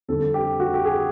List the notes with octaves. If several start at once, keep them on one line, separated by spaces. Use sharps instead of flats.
F2 D3 G3 A4
G4
F#4
G4
G#4